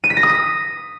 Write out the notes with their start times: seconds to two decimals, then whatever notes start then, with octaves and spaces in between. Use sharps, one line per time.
0.04 D#7
0.10 B6
0.17 A#6
0.23 D#6
0.30 B6